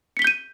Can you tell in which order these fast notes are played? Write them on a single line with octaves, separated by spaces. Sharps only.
C#7 B6 G7 G6 D#7